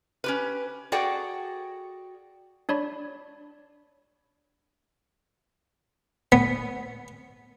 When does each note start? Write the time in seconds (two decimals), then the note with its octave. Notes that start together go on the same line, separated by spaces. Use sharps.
0.24 C#4 G4 B4
0.92 F#4 G#4 A4 D5 F#5 G5
2.69 D4 C#5 D5 B5
6.32 B3